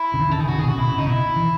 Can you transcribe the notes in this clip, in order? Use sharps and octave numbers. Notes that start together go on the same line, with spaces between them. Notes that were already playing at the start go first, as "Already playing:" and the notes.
Already playing: E4
C#3
D#3
C#3 A4
D#3 G#4
C#3 F#4
D#3 G#4
B2
C#3 F#4
B2 E4
C#3
C#3 D#4
B2 E4
E3